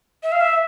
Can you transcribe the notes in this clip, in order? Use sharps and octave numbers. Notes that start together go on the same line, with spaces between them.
E5
F5
E5